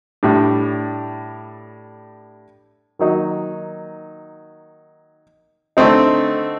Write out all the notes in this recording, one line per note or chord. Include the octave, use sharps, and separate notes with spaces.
A2 G3 D4
D#3 F#3 A#3 D#4
D3 A3 C4 D#4